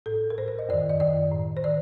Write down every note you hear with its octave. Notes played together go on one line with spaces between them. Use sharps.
A2 A4
A#4
A2 C5
C5
D#5
F#2 D#3 D5
D#5
F#2 D#3 D5
A2
C5
D#3 D5